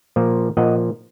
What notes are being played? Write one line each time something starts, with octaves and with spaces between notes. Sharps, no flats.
A#2 F3 A#3
A#2 F3 A#3 D#5 F#5